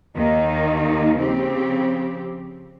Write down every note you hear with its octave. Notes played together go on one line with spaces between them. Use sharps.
D#2 D#3 A#3 D#4
C#3 F3 C4 G4